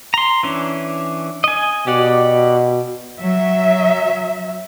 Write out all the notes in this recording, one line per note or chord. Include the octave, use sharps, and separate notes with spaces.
A#5 C6
E3 C#4 D4
D#5 G#5
B2 G4 D5 F#5
F#3 E5